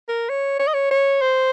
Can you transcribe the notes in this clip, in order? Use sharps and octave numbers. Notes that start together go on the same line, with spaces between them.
A#4
C#5
C#5
D#5
C#5
C#5
C5